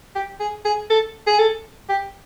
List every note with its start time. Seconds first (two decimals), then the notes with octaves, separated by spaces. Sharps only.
0.15 G4
0.40 G#4
0.65 G#4
0.90 A4
1.27 G#4
1.39 A4
1.89 G4